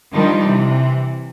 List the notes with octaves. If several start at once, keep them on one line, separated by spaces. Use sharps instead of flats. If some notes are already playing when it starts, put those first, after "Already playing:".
D#3 F3 G3 D4 D#4
C3 E3